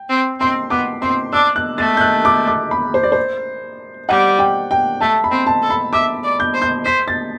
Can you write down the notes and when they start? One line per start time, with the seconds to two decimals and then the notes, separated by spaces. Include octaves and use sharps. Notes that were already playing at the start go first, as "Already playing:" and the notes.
Already playing: G5
0.09 C4
0.40 C4 C6
0.70 B3 D6
1.02 C4 C6
1.33 D4 E6
1.56 F#6
1.78 A3 A6
1.97 G6
2.01 F#6
2.25 D6
2.47 D6
2.71 B5
2.94 C5
3.03 D5
3.12 C5
4.09 G3 F#5
4.39 G5
4.71 G5
5.01 A3 A5
5.24 B5
5.31 C4
5.47 A5
5.62 A4
5.70 B5
5.93 E5 D6
6.24 D5
6.40 G6
6.54 C5
6.62 G6
6.85 C5 B6
7.08 A6